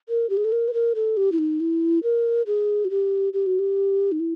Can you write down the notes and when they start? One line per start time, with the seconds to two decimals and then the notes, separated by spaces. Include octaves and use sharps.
0.09 A#4
0.30 G4
0.37 G#4
0.45 A4
0.52 A#4
0.68 B4
0.73 A#4
0.95 A4
1.17 G4
1.32 E4
1.38 D#4
1.60 E4
2.03 A#4
2.47 G#4
2.85 F#4
2.90 G4
3.33 G4
3.46 F#4
3.59 G4
4.12 D#4
4.20 E4